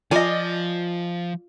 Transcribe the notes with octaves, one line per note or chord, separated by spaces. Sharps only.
F3 F4 D5 D#5 F5 G#5